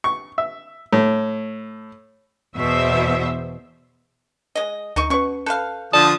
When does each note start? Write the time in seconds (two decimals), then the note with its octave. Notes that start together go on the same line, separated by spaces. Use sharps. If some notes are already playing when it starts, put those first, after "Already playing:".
0.04 C#6
0.38 E5
0.93 A2
2.56 E2 B2 C5 E5
4.55 G#3 D#5
4.96 D2 D#4 D#5 C#6
5.10 B2 C#4 B4 C#6
5.46 A4 B4 F5 F#6 G6
5.93 D3 F3 D5 A5 D#6